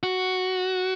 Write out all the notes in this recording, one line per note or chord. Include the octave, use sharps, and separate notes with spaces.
F#4